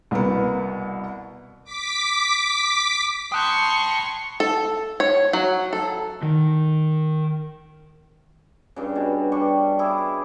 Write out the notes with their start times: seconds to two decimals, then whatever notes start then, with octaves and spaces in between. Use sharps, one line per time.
0.11 C2 B2 A#3 B3
1.64 D6 B6
3.32 G5 A5 C6 C#6 D#6 F#6 G6
4.40 A4
5.00 C#5
5.33 F#3
5.73 A4
6.23 D#3
8.76 G2 C#3
8.96 B2
9.32 G3 D4 C#6
9.79 E4 G#4 D5